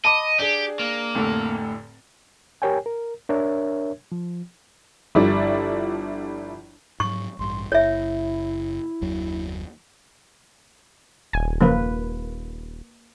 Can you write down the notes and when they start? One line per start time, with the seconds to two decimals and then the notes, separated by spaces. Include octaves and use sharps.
0.05 D#5 A5 B5 D6
0.39 D4 G4 G#4
0.79 A#3
1.15 F1 A2 D3
2.62 G4 A#4 C#5 G5 G#5
2.86 A#4
3.29 D4 A#4 C#5 E5
4.12 F3
5.15 G1 F3 G3 D4 E4 D5
7.00 G#2 F#3 C#6
7.39 A1 G2 C6
7.72 F#1 E4 C#5 E5
9.01 F#1 D#2 F#3
11.33 D#1 G#5
11.61 F#2 C#3 F3 A#3 B4